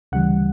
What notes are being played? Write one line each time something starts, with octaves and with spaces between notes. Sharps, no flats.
D2 C#3 E3 G3 F#5